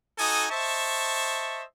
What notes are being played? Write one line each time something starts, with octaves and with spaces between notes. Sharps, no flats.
D#4 F#4 A4 G#5 D#6
C5 D#5 E5 A5 C#6